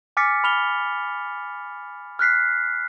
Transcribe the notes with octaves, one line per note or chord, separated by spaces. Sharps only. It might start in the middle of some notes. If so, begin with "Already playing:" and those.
G#5 D6 F6 A6 B6 C#7
B5 F6 F7 G7
F6 F#6 B6 C7